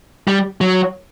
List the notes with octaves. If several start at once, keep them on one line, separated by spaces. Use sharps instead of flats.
G3
F#3